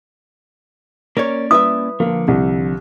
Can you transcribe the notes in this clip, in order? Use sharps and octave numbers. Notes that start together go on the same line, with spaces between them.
A#3 C#4 A#4 C#5 D5
E4 B4 E5 D#6
D3 F3 A#3
C2